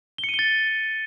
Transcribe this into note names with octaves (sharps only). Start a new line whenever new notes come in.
G7
C#7
D#7
G7
A6